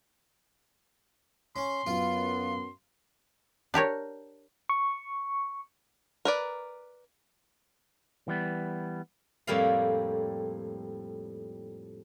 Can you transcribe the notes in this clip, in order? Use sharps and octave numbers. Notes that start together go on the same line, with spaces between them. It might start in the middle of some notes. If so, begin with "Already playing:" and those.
C#4 C6
F#2 B3 F4
D4 G4 A#4 C#5
C#6
A#4 B4 D5
E3 G3 B3
F2 A2 G3 A#3 D5 F5